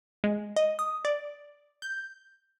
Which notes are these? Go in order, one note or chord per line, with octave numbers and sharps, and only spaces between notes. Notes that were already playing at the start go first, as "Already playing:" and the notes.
G#3
D#5
D#6
D5
G6